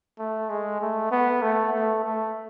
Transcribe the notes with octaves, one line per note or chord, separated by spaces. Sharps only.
A3
G#3
A3
B3
A3
A3
A3